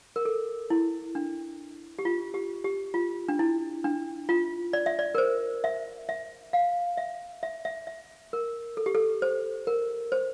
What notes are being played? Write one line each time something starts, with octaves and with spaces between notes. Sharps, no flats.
A#4
A4
E4
D4
G4
F4
G4
G4
F4
D4
E4
D4
F4
D5
E5
D5
A#4
C5
E5
E5
F5
E5
E5
E5
E5
A#4
A4
G4
A4
C5
A#4
C5